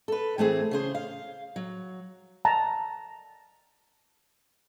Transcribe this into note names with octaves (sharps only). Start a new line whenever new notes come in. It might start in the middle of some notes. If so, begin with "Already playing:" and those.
A4 B4
E3 A3 C4 G#4
C#3 G#4 C5
F5
F#3
A5 A#5